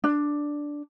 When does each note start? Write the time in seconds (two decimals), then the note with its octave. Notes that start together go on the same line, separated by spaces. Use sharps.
0.04 D4